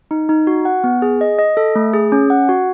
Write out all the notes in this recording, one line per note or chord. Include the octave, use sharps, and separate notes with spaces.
D#4
D#4
F#4
F#5
B3
G#4
D#5
D#5
A4
A3
G#4
C#4
F#5
F#4